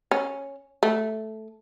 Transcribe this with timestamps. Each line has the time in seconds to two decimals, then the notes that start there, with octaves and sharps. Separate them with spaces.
0.11 C#4
0.83 A3